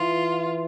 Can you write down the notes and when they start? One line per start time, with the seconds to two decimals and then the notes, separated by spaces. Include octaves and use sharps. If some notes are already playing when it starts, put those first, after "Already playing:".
Already playing: E3 F4